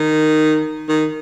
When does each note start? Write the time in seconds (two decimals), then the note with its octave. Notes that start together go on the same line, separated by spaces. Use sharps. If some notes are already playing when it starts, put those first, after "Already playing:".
Already playing: D#3
0.89 D#3